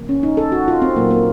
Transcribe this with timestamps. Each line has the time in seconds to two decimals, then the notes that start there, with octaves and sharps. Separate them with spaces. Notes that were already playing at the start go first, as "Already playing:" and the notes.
Already playing: C#3 F3 A#3
0.09 C#4
0.23 D#4
0.37 A4
0.52 F#4
0.68 F4
0.82 C4
0.96 A#2 F#3 A#3
1.11 A#3